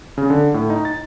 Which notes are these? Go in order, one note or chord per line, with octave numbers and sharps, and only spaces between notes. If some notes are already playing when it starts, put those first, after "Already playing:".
C#3
D3
A2
D#4
A6